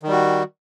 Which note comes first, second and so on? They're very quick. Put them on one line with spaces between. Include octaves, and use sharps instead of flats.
D#3 G3 F#4